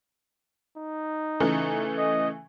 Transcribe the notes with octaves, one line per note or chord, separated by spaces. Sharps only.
D#4
C#3 E3 A3
D#5